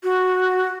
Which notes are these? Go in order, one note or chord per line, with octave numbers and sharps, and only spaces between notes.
F#4